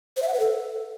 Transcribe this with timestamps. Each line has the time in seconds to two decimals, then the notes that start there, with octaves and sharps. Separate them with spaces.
0.17 C5
0.22 E5
0.28 F#5
0.34 B4
0.40 A4